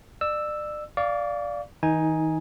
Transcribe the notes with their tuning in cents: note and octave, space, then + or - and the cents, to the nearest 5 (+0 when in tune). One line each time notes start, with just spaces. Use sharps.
D5 +35 E6 +0
D5 -5 F5 +0 C#6 +45
D#3 +45 D#4 +15 G#5 -5